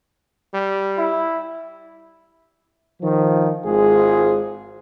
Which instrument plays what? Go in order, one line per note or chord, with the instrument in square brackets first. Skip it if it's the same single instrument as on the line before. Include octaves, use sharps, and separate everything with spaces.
[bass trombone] G3
[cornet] E4
[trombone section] D#3 F3
G#1 G#3 F4 G#4 C5